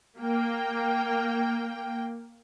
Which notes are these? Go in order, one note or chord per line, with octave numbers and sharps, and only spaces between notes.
A#3 G5